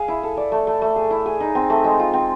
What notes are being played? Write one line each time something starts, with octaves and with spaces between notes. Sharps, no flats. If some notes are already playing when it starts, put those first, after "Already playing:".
Already playing: G#4 F5
E4
A4
D5
A3
A3
A3
G#4
E4
G#4
D#4
C4
A3
G#3
F4
C4